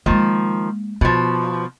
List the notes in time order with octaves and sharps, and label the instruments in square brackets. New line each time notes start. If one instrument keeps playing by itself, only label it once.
[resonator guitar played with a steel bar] D#3 F3 [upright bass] G#3 A#3
[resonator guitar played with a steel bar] B2 F3 [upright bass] B3